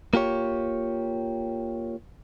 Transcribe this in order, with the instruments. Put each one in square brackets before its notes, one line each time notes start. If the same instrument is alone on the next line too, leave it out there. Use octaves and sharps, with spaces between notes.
[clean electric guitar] A#3 F4 G4 C#5